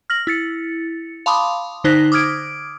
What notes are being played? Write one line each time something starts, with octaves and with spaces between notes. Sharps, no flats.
F6 A#6 F#7
E4 A6 C#7
F5 A5 B5 C6 D6 D#6
D3 D#4 C5 F#6 A#6 B6
D6 D#6 F6 G#6 D7